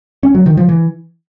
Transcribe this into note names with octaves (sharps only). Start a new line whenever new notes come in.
C#4
F#3
D#3
F3
E3